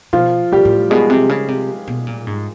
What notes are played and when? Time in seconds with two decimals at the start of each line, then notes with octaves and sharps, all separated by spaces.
0.13 B2 F3 F4
0.52 A#2 G3 G4
0.65 A2
0.90 B2 G#3 G#4
1.10 C3
1.29 C#3
1.48 C3
1.88 B2
2.07 A#2
2.27 G#2